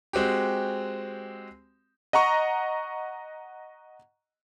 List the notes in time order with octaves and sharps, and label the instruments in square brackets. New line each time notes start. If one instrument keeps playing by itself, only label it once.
[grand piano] G#3 C4 F#4 G4
[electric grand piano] D#5 F#5 A#5 C#6